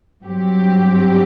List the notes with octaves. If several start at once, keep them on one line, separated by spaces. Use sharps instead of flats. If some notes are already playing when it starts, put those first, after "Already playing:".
G2 F#3 C4 G4